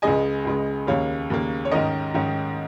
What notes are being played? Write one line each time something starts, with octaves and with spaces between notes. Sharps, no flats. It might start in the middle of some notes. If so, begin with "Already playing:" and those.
C#2 C#3 G#3 D#5 G#5
C#2 C#3 G#3
D#2 C#3 A#3 C#5 F5
D#2 C#3 A#3
C#5
G#2 D#3 C#4 A#4 D#5
G#2 D#3 C#4